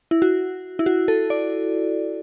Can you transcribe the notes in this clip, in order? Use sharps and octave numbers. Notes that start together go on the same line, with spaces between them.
E4
F#4
E4
F#4
A4
D5